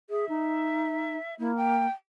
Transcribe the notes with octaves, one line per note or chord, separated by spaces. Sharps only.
G#4 E5
D#4
A#3 E4
G5